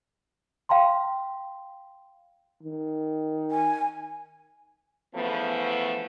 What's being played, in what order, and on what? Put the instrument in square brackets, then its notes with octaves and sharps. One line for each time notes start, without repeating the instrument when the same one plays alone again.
[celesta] F5 G5 A#5 C6
[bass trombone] D#3
[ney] G#5
[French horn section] C#3 E3 F3 A3 B3